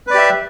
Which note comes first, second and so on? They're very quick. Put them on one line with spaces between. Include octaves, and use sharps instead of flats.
B4 D5 G4 E5